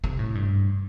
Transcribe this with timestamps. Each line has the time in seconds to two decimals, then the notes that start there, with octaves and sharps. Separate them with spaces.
0.04 C3
0.19 A2
0.35 G2